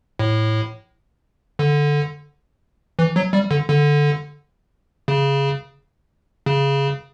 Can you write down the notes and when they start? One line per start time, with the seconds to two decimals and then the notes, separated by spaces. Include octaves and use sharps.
0.19 A2
1.59 D3
2.99 E3
3.16 F#3
3.33 G3
3.51 D3
3.69 D3
5.08 C#3
6.46 C#3